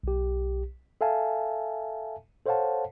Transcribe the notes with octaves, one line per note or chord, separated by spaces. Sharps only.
B1 G4
A4 E5 F5 G#5 A5
A4 C5 C#5 F5 F#5 A5